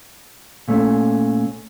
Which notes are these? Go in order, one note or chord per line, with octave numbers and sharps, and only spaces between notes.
A#2 A3 C#4